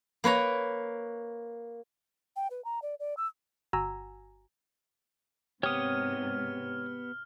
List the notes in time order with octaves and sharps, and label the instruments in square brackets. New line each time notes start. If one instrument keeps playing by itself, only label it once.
[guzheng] A#3 B4 C#5 A#5
[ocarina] G5
B4
A#5
D5
D5
E6
[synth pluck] G1 F#4 G#5 A#5 E6
[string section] G#2 C3 [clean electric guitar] B3 G4 [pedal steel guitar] C#5 D#6 [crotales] F6